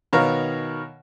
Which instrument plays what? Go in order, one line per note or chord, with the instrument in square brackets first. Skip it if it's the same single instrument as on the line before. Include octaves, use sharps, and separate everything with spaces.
[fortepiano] B2 D#3 C#5 F5 A#5